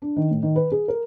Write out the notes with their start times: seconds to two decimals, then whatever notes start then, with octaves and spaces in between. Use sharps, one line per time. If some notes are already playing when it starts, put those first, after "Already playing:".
0.02 D4
0.16 D#3
0.31 A2
0.43 D#3
0.56 B4
0.72 G#4
0.88 A#4